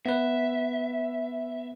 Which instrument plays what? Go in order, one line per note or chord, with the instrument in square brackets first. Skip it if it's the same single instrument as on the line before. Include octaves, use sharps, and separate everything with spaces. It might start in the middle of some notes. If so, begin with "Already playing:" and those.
[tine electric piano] B3 B4 [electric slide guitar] E5